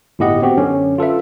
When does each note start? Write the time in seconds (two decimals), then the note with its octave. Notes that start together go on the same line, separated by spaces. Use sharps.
0.19 G1 A2 E4 G4 D#5 F#5
0.42 B3 C4 F#4 G4
0.57 F#2 D3 C#4
0.98 F4 A4 B4 E5